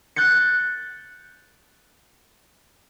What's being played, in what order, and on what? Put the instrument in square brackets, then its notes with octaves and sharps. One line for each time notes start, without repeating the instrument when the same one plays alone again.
[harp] F#6 G6 A6 C#7